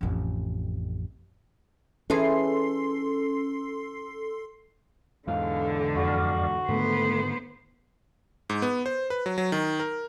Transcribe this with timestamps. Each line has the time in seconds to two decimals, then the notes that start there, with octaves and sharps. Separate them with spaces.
0.01 A1 F2
2.10 E3 C#4 G#4 A4 C6 C7
5.28 E2 G#2 D3 F5
5.96 F2 F#4 D5 F5
6.69 G#2 D3 D#3 A3 B3 C5
8.49 G#2
8.62 B3
8.86 C5
9.10 B4
9.26 F#3
9.38 F#3
9.52 D#3
9.80 A#4